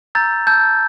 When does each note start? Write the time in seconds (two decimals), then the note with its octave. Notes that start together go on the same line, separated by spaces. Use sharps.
0.15 A#5 E6 G6 A6
0.47 A5 E6 G6